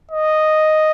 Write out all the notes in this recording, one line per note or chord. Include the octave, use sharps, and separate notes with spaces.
D#5